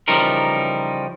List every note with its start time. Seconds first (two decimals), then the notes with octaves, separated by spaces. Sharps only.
0.08 C#3 E3 F3 G3 D#4 A#4